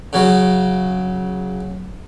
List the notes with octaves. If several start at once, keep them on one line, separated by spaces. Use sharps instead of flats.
C#3 F#3